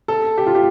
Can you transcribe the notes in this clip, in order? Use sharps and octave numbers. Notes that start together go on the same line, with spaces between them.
A4
G4
F4
G4